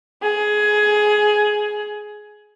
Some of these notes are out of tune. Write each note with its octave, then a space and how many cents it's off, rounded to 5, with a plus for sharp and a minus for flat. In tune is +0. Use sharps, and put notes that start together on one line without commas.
G#4 +15